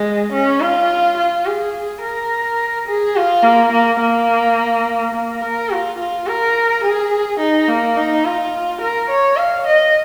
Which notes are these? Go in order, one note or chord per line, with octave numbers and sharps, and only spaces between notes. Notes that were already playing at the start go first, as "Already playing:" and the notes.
Already playing: G#3
C#4
F4
F4
G#4
A#4
G#4
F4
A#3
A#3
A#3
A#3
A#4
F4
F4
A#4
G#4
D#4
A#3
D#4
F4
A#4
C#5
F5
D#5